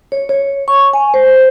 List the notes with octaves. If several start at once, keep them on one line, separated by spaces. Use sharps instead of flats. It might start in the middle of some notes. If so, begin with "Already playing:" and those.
C#5
C#5
C#6
G#5
C5